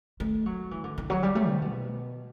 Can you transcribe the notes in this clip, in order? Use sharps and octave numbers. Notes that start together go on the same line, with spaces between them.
A3
F#3
E3
D3
D3
F#3
G3
A3
C3
B2